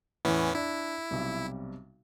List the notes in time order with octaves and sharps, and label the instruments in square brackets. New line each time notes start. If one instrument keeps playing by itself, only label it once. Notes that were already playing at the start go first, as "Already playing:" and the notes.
[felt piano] E2 A2 [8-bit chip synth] E3 B3 C#4
[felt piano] D4 [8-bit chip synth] E4
[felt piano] B1 C3 G3